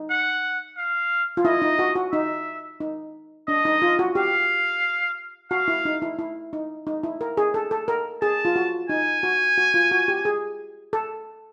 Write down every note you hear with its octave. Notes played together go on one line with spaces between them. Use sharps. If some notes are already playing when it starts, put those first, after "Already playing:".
Already playing: D#4
F#5
F5
F4
E4 D#5
D#4
F#4
F#4
D#4 E5
D#4
D4 D#5
D#4
F4
F#4
G4 F5
F#4 F5
E4
D#4
E4
E4
D#4
D#4
E4
A#4
G#4
A4
A4
A#4
G#4 A5
F4
F#4
D#4 G#5
F#4
F#4
F4
F#4
G4
G#4
A4